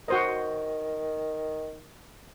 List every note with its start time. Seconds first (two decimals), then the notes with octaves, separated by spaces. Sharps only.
0.08 D#3 F#4 C5 D#5